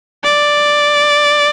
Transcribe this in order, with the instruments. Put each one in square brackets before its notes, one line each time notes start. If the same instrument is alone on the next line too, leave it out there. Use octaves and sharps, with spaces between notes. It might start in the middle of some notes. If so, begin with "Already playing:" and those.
[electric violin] D5